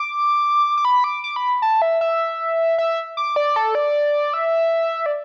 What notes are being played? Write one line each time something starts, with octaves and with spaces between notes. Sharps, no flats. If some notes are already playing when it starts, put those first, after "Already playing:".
Already playing: D6
D6
B5
D6
D6
B5
A5
E5
E5
E5
D6
D5
A4
D5
E5
D5